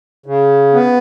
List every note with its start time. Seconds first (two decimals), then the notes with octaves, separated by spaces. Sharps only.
0.26 C#3
0.73 B3